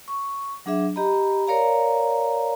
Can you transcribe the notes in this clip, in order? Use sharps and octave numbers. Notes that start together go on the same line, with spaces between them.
C#6
F#3 D4 G#4 E5
G4 D#5 A#5 B5
A#4 C#5 D5 F5 A#5